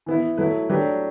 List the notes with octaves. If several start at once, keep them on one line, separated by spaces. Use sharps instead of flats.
E3 B3 E4
F#3 A3 E4 B4
F#3 A3 D4 G4 B4